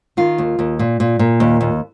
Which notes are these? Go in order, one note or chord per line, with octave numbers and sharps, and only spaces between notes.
D#3 F4
D#2
D#2
A#2
A#2
A#2
D#2
D#2